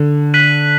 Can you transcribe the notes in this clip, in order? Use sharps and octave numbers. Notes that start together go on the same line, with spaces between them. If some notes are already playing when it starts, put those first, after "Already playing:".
Already playing: D3
F#6 B6 D#7 F#7